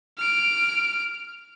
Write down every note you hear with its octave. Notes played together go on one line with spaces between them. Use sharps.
F6 D7